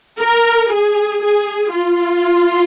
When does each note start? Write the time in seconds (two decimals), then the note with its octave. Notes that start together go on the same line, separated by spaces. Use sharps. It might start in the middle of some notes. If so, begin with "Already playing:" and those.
0.20 A#4
0.72 G#4
1.22 G#4
1.71 F4